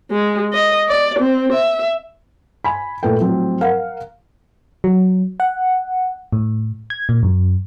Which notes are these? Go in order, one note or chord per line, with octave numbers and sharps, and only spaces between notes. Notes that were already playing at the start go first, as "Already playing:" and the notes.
G#3
D#5
D5
C4
E5
G#5 B5
A#2 A3 B4 G5
A2 F3 F#3 C4
A#4 F5 F#5
F#3
F#5
A2
G#6
A#2
F#2